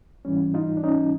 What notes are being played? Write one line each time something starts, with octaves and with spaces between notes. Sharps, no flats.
G#2 E3 G3 C#4
D#4 F4
D4
C#4 D#4